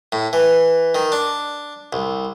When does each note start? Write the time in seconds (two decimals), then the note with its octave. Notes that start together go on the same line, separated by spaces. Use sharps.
0.12 A2
0.33 E3
0.95 D#3
1.12 D4
1.93 C2